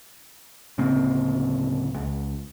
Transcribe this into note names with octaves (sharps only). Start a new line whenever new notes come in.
D1 C#3 A#3 C4
C#2